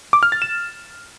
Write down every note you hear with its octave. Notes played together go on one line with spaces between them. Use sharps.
D6
F6
A6
E7